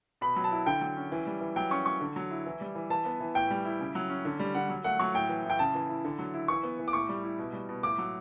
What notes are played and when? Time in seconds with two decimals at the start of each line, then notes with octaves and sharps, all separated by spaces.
0.21 B2 B5
0.36 F#3
0.44 A5
0.52 E4
0.66 D3 G5
0.81 F#3
0.96 C#4
1.12 E3
1.27 G3
1.41 E3
1.56 F#3 G5
1.71 C#4 C#6
1.86 F#3 C#6
2.01 D3
2.16 F#3
2.31 E4
2.46 E3
2.61 G3
2.75 E3
2.90 E3 A5
3.05 B3
3.20 E3
3.35 A2 G5
3.50 G3
3.65 E4
3.80 C#3
3.95 F#3
4.09 C#4
4.25 D3
4.39 G3
4.55 D3 F#5
4.69 F#3
4.84 A3 F#5
4.99 F#3 C#6
5.14 A2 G5
5.29 E3
5.45 A2
5.50 G5
5.59 C#3 A5
5.75 E3
5.89 E4
6.04 D3
6.19 F#3
6.34 E4
6.48 E3 C#6
6.63 B3
6.79 E3
6.88 D6
6.93 A2 C#6
7.09 G3
7.24 E4
7.38 B2
7.53 G3
7.69 B2
7.83 A2 D6
7.98 F#3